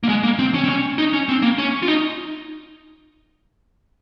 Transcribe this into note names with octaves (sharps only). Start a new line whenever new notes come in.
A#3
G#3
A#3
C4
C#4
C4
C#4
D#4
C#4
C4
A#3
C#4
F4
D#4